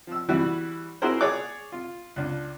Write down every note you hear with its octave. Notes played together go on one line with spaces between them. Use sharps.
F3 E6
E3 G3 E4 F#4
E4 F#4 G#4 A#4 C5
G#4 C#5 D5 D6
F4
C#2 D4